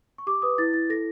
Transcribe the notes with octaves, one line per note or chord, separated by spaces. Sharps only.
C#6
G4 D6
B4 D#6
E4 A6
E4 A6
A4 A#6